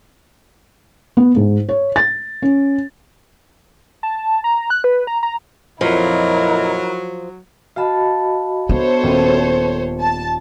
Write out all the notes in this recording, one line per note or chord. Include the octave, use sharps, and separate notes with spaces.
B3
G#2
C#5
A6
C#4
A5
A#5
F#6
B4
A#5
A#5
F2 A#2 F3 F#3 E4 A#4 D#5
F#4 D#5 F5 A5 B5
B3 D4 A4 C5 C#5
D#1 C6 D#7
A5